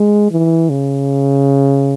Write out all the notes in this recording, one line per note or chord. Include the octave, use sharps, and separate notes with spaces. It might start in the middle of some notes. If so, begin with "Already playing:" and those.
Already playing: G#3
E3
C#3